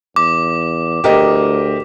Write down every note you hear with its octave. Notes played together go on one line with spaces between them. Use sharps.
E2 D6
D2 G4 A#4 D#5